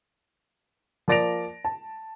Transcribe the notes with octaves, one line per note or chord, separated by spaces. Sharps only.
F3 A#3 D5 A#6 D7 F7
A5